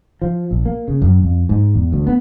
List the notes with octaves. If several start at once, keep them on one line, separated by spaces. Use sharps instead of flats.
F3
A#1
A#3
C#3
F#2
F2
G#2
E2
D2
B3